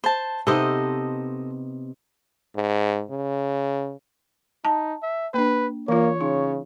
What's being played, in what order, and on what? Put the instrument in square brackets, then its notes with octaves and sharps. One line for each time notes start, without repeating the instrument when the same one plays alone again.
[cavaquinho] C5 A5
[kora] C3 B3 D#4 [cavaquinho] A4 C5 D#5
[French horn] G#2
C#3
[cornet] D#4 [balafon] A5
[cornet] E5
[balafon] A#3 D4 [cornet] B4
[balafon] E3 F4 [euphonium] A#3 [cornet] C#5
[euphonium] C#3 [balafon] D#4